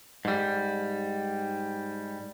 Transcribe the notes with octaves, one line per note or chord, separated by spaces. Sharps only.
G#2 G3